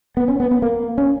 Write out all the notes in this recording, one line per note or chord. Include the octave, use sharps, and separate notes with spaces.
B3
C#4
B3
B3
A#3
C#4